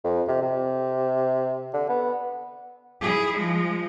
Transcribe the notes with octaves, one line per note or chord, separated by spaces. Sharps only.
F2
C3
C3
D3
B3
E4 G#4
F3 G#3